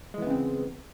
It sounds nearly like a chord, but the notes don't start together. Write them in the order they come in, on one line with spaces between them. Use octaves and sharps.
G#3 E3 B3 C#3 C4